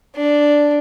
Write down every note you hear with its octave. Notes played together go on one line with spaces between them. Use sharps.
D4